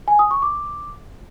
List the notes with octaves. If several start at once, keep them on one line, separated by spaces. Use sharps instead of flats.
G#5
D#6
C#6
D6